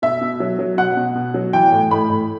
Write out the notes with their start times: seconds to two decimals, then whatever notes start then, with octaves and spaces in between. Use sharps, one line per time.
0.02 B2 E5
0.21 B2
0.40 F#3
0.59 F#3
0.78 B2 F#5
0.97 B2
1.15 B2
1.34 F#3
1.53 E3 G5
1.72 A2
1.91 A2 B5
2.10 A2